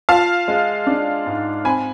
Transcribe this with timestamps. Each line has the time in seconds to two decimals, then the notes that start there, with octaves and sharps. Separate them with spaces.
0.09 F4 F5 A5
0.48 G#3
0.87 D4
1.26 G#2
1.64 C4 G#5 B5